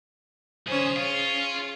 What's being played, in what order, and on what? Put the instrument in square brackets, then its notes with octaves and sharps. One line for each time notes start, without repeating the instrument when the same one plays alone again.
[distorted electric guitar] B1 G#4 [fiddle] C#4 C5
[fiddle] C#4 G#4 [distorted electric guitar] F4